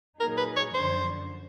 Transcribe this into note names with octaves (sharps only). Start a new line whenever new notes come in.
A#2 F#3 A#3 D#4 G#4 A#4
B4
C#5
F#2 D3 F3 C5